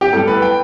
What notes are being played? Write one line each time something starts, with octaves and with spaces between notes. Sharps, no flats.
G4
A2 G3 B3 A4
B4
G5